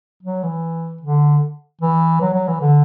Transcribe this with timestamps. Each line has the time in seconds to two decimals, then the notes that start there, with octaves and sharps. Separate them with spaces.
0.23 F#3
0.43 E3
1.02 D3
1.81 E3
2.21 F#3
2.34 F#3
2.48 E3
2.61 D3